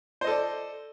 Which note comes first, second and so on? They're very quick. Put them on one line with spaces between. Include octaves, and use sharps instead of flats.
C5 D#5 A4 D5